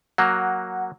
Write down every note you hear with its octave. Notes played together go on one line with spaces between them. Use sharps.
F#3 A#3 F#5